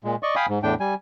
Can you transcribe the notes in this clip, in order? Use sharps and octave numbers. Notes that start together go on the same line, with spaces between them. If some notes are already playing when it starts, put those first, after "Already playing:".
A#2 G#3
D5 D#5 C#6
F5 G5 G#5 B5 D#6
G#2
E2 A2 D4 G5
G3 G#5